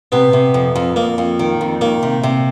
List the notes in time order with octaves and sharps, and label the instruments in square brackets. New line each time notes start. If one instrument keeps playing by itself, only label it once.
[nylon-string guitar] C3 [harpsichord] B3
[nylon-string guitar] C3
F2
F2
[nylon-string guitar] F2 [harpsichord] A#3
[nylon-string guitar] F2
D#3
F2
[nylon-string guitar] D#3 [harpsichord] A#3
[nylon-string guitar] C3
C3